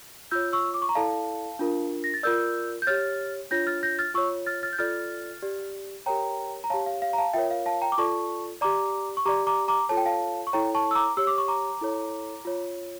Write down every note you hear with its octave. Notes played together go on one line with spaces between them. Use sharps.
F4 C#5 E6 G6
C#6 E6
D6
C#6
A#5
E4 A4 D5 F5 A5
D4 F4 A#4
A#6
A6
F4 A#4 D5 E6 G6
G6
G4 C#5 F6 A6
D4 F4 C#5 G6 A#6
F6 A6
G6 A#6
F6 A6
F4 C#5 C#6 E6
F6 A6
F6 A6
G6
F4 A4 D5 F6 A6
G4 D5
G4 A#4 C#5 G5 A#5
A#5
G4 C#5 F5 A5
F5
F5
A#5
F5 A5
F4 A#4 C#5 E5 G5
F5
F5 A5
G5 A#5
D6
F4 A4 D5 A5 C#6
G4 D5 A#5 D6
C#6
G4 D5 A#5 D6
A#5 D6
A#5 D6
F4 A4 C#5 A5
G5
F5 A5
C#6
E4 A4 C#5 G5 A#5
A5 C#6
E6
A#5 D6
G4 C#5 E6
D6
C#6
A#5 D6
E4 A4 C#5
F4 C#5